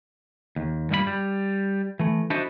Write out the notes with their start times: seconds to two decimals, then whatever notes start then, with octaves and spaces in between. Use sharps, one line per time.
0.56 D#2
0.91 G2 A#2 G3 A#3 G#4 B5
1.07 G3
1.99 E3 A3
2.30 D4 E4 F#4 A4 C5 D#5